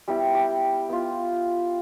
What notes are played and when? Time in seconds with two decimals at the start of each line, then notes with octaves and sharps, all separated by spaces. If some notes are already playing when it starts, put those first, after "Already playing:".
0.08 G3 B3 E4 G4
0.35 G4
0.89 B3 F4